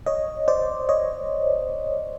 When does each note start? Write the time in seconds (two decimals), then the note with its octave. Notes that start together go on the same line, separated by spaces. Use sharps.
0.06 C#5 D#5
0.48 C5 D5
0.89 C#5 D#5